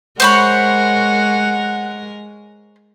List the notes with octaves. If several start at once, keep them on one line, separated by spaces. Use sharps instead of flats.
G#3 A#4 C5 C#5 F#5 B5